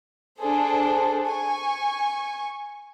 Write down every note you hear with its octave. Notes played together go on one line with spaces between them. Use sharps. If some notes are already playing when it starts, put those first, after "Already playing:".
D4 G#4 A4 C5
G#5 C#6